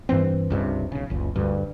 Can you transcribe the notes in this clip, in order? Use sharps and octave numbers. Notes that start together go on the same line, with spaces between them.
G2 E3 C4
C#2 G2 C3
B1 C#3
F#1 C#2
D2 G2